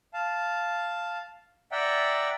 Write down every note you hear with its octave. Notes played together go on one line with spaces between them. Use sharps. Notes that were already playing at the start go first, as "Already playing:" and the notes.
F5 A5
D5 E5 F#5 G5 A#5